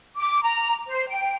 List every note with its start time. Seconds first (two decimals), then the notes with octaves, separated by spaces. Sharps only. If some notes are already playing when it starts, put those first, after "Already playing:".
0.17 D6
0.43 A#5
0.88 C5
1.09 G5